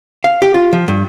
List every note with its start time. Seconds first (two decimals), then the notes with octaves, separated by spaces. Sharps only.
0.24 F5
0.42 G4
0.54 F4
0.73 F3
0.88 G2